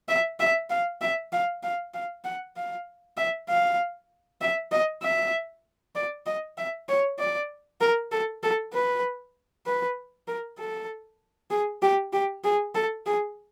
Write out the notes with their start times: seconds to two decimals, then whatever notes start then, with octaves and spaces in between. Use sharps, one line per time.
0.09 E5
0.40 E5
0.70 F5
1.01 E5
1.32 F5
1.63 F5
1.94 F5
2.25 F#5
2.56 F5
3.17 E5
3.49 F5
4.41 E5
4.72 D#5
5.03 E5
5.96 D5
6.26 D#5
6.58 E5
6.89 C#5
7.19 D5
7.81 A#4
8.12 A4
8.43 A4
8.73 B4
9.66 B4
10.28 A#4
10.59 A4
11.51 G#4
11.82 G4
12.13 G4
12.44 G#4
12.75 A4
13.06 G#4